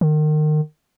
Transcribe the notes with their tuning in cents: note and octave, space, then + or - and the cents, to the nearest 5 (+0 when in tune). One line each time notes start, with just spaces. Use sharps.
D#3 -30